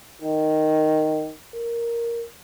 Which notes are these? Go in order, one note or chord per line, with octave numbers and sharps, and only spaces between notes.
D#3
A#4